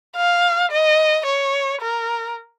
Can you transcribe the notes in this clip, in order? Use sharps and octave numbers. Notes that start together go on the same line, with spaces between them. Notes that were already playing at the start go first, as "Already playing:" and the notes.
F5
D#5
C#5
A#4